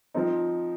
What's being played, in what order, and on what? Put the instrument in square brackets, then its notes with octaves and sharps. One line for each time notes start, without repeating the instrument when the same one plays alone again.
[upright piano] F3 C4 D#4